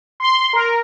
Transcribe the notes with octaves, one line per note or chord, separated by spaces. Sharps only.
C6
A#4